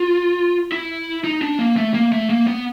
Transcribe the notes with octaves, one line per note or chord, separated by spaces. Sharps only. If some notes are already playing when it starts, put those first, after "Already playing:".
Already playing: F4
E4
D#4
D4
A#3
A3
A#3
A3
A#3
B3